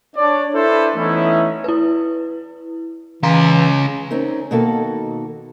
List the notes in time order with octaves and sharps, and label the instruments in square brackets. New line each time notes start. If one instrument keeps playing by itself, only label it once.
[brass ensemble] D4 C#5 D5
D4 E4 A4 B4 C5
E3 A3 B3 C#4 D#4 E4
[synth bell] E4 B4
[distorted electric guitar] C#3 C6 [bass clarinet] E3 [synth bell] F5 A#5
[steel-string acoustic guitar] C4 C#4 D#4 A#4
B2 D#3 A#3 F#4 A4